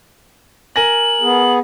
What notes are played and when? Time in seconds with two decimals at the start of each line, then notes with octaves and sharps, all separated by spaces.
0.76 A#4 G#5 A#6 F#7
1.21 B3 G#4